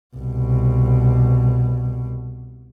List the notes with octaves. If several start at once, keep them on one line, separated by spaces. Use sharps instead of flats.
C2 B2